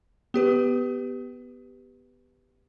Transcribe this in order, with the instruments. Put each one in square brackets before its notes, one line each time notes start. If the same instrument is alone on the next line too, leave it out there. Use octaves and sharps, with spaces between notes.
[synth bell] B3 G4 B4